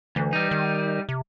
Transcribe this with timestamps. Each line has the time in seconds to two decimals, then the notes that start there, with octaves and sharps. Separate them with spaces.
0.16 D2 E3
0.33 G3 D#4
0.51 D#3
1.09 C3